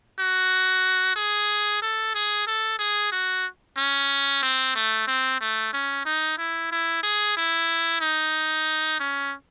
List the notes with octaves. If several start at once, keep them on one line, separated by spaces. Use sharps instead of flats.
F#4
G#4
A4
G#4
A4
G#4
F#4
C#4
C4
A3
C4
A3
C#4
D#4
E4
E4
G#4
E4
D#4
C#4